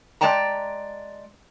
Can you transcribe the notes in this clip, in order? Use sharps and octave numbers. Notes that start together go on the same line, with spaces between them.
G#3 D5 G5 A5 A#5